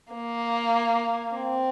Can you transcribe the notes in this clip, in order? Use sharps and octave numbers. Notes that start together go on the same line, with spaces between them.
A#3
C4